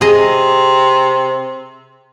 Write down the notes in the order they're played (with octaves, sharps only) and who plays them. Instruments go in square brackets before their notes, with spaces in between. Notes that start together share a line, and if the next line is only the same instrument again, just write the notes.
[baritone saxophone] C3 [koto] G#4 D#5